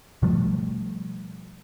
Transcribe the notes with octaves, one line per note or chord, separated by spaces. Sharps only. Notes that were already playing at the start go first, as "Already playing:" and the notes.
B2 F3 G3 A3